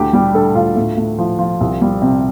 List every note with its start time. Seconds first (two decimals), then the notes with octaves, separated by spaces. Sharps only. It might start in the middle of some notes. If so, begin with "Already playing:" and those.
Already playing: D2 G4
0.13 G3 G4
0.34 D3 A4
0.55 D2 F4
0.76 A2
0.97 A2
1.19 F3
1.39 F3
1.61 C2
1.81 G3
2.02 C3